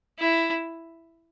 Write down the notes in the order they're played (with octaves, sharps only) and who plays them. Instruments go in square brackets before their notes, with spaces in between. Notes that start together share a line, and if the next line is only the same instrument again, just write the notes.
[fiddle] E4